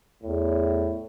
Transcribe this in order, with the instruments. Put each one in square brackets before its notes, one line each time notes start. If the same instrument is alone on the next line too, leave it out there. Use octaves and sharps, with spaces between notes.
[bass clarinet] E2 [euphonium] A2